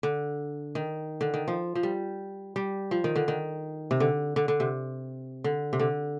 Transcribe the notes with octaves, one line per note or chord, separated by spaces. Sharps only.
D3
D#3
D3
D#3
F3
F3
G3
G3
F3
D#3
D3
D#3
C3
D3
D3
D3
C3
D3
C3
D3